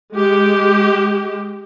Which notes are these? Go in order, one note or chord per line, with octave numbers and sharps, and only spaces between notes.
G#3 G4